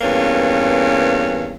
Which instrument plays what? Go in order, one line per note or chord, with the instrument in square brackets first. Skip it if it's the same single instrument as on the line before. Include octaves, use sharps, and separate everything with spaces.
[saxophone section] E2 G2 A#3 C#4